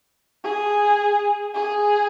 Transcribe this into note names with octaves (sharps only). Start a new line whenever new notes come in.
G#4
G#4